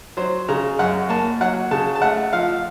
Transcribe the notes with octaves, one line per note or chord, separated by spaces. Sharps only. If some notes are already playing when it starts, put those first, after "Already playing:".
F#3 C5
C#3 A#5
F#2 F#5
A#3 A5
F#3 F#5
C#3 A5
A5
A3 F#5
F3 F5